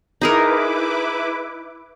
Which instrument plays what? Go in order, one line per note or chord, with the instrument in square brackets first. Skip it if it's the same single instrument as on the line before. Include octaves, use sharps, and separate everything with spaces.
[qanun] D#4 G#4 A#4 [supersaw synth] E4 B4 D6